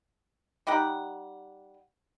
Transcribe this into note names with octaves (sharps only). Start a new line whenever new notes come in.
G3 D#4 G4 F#5